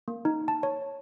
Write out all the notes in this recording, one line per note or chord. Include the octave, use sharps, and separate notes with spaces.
A#3
D#4
A5
C#5